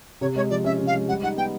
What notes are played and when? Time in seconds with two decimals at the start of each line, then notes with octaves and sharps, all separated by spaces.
0.21 C3 C#5
0.36 G#3 C#5
0.50 F3 D5
0.64 C#4 E5
0.79 C3
0.87 F5
0.93 G#3
1.08 G3 F#5
1.22 D#4 F#5
1.37 B3 G5